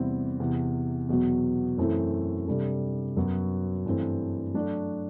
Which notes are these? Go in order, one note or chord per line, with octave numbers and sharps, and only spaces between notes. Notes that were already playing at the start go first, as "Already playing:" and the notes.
Already playing: E2 C3 G3 C4 E4
E2 C3 E3
E2 B2 F#3 B3
F#2 E3 A3 C4 E4
C3 G3 D4 A4
F#2 F#3 B3 F#4
G2 E3 A3 C4
F#3 A3 D4 F#4